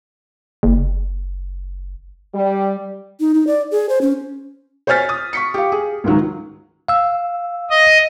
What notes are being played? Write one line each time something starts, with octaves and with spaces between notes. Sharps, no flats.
F#1
G3
D#4
D#4
D5
G#4
C5
C#4
C5 C#5 G#5 F6 A6 B6
D#6
C#6 B6 C#7
G4 F5
G#4
C#2 G#2 D#3 F#3
F5 E6
D#5